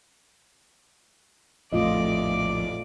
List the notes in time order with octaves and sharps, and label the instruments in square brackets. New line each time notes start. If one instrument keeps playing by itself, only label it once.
[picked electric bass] A#1 F2 A2 [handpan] A3 F4 D#5 [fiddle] D5 D6